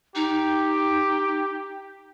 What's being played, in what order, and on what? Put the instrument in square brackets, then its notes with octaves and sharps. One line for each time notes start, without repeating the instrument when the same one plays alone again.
[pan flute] D#4 [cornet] G4